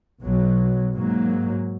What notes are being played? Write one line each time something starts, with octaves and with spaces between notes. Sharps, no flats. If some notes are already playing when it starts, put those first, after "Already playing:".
B1 B2 F#3
G#2 F#3 A#3